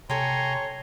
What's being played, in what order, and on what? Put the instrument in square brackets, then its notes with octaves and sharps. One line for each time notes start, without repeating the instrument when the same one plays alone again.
[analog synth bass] C3 [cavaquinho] A4 G5 [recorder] C#5 [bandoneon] G#5 A#5 C6